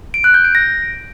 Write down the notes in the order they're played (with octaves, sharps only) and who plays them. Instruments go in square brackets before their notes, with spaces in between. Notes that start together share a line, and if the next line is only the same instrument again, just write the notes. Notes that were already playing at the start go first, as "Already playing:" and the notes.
[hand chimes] D7
F#6
G6
D7
A#6